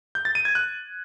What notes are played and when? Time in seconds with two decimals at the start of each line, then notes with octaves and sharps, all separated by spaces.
0.15 G6
0.25 A6
0.35 D#7
0.45 G#6
0.55 F#6